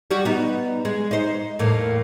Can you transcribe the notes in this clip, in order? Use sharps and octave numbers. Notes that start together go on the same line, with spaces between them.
G3 F#4
B3 D#4
G#3
D#4 C5
E2 A2 A#3